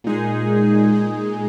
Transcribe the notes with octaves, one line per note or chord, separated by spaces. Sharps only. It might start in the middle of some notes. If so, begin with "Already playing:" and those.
A#2 G#3 D#4 G#4
A#2 G#3 D#4 G#4